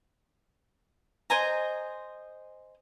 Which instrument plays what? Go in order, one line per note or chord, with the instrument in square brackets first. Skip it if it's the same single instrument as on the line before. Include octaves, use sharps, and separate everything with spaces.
[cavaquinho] C5 D#5 G#5 A#5